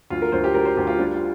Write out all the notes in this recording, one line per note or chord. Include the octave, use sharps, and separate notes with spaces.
D2 F4
A#4
D2 C5
G4
D2 A#4
C5
D2 G4
F4
G3 D4
F4